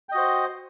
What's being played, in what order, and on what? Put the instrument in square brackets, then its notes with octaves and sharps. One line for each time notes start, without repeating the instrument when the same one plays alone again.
[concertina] G5
D#5
F#4
C5